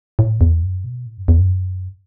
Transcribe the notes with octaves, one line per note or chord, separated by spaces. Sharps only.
A2
E2
F#2
B2
A2
F#2
E2
F#2